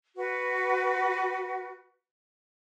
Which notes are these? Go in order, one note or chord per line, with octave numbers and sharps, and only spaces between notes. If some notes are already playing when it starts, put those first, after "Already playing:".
F#4 B4